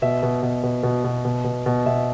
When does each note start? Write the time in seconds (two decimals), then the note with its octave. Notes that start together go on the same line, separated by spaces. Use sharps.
0.02 B2 E5
0.23 B2
0.43 B2
0.63 B2
0.83 B2
1.04 B2
1.25 B2
1.44 B2
1.66 B2
1.86 B2 E5